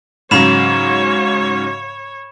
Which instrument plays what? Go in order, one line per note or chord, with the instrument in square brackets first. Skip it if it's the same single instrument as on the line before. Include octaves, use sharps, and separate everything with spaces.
[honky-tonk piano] G#2 C#3 F#3 [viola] C#5 [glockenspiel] B5 E7